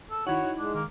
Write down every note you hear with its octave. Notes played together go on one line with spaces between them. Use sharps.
A4
D#3 D#4 E4 F#4 C#5 F#5
D#4
G#3 D4
D#3 A#3